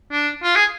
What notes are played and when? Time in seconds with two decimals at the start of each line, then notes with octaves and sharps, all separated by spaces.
0.11 D4
0.43 F4
0.56 G#4